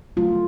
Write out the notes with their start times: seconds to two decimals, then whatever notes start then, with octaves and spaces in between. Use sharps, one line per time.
0.16 D3 F#3 A3 F4